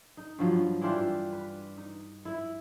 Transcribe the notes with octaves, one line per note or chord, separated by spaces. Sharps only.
D#4
G2 F3 F#3
E3 D4 F4 G4
B4
D#4
E4